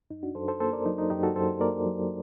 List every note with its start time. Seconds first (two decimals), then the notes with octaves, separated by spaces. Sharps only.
0.10 F#2 D#4
0.23 D4 F#4
0.35 F#2 A4 C5
0.48 A4 C5
0.60 A#3 A4 C5
0.73 A#4 D5
0.86 F#3 D#4
0.98 D#4
1.10 F#2 D#4 G4
1.23 F#4 A4
1.36 F#2 A4 C5
1.60 A#3 A#4 D5
1.86 F#3